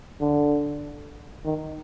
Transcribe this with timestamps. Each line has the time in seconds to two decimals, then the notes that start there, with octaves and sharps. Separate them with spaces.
0.21 D3
1.45 D#3